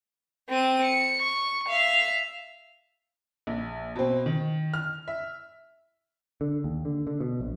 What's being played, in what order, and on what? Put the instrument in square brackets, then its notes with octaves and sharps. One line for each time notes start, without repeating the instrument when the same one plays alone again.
[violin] C4 D#7
C#7
C#6
E5 F5
[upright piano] A#1
B2 C4
D#3
F6
E5
[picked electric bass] D3
D#2
D3
D3
B2
A#1